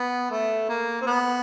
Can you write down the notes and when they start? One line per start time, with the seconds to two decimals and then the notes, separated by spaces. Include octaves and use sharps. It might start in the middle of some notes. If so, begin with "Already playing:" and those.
Already playing: B3
0.30 A3
0.69 A#3
1.01 C4
1.07 B3